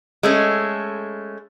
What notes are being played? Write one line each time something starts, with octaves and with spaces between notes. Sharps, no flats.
G#3 A3 C#4